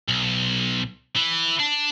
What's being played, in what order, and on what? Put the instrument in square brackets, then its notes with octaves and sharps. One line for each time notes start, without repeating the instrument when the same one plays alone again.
[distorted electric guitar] B1
E3 E4
D4